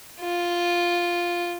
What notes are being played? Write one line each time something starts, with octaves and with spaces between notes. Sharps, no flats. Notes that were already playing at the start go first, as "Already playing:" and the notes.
F4